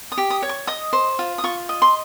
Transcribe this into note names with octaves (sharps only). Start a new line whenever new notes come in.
D#6
G4
D#6
C#5
C#6
D#5 D#6
C5
F4
D#6
F4 C#6
D#5
C6